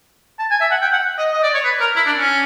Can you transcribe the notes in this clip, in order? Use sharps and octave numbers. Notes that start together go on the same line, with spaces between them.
A5
G#5
E5
F#5
G5
F#5
D#5
D#5
D5
C#5
B4
A#4
E4
D4
C#4